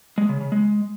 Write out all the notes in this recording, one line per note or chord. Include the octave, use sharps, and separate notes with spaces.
G#3
C#3
C#3
G#3